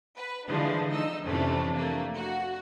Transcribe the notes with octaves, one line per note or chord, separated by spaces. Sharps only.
B4
D3 E3 F3 G#3 D4
D#4 D#5 E6
F2 C3 E3 A3 C#4 D4
A3 A#3 D4
F#4